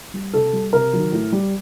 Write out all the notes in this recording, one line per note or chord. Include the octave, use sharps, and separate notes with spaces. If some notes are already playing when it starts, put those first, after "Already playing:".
G3
C3 A4
G3
C3 A#4
D#3 F#3
A2
G3